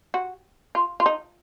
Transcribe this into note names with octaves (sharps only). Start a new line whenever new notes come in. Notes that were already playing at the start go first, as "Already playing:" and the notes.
F#4
F4
F4
D#4